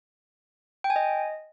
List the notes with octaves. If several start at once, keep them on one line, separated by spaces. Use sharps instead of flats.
G5
G#5
D#5